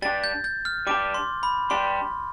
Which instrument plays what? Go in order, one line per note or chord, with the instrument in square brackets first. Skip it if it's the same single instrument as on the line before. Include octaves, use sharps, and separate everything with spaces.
[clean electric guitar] G3 D4 G4 [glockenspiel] A6
[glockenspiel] G6
G6
F6
[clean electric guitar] G3 D4 G4 [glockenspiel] D6
[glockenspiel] C6
B5
[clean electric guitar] G3 D4 G4 [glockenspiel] C6